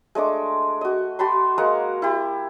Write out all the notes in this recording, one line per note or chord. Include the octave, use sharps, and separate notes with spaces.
G#3 A3 D4 D6
F#4 D#5
F#4 A5 B5 C6
G#3 A#3 F#5 A#5
E4 G4